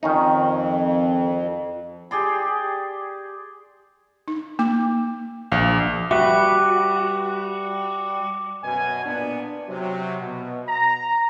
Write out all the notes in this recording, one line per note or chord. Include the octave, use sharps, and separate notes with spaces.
F2 D#3 C#4 D#4
G4 G#4 D5 C6
D#4
A#3 D6
A#1 F5
G3 F#4 B4 E5 D6
F#2 B2 G#5
A#2 B3 D4
C3 F#3
B2
A#5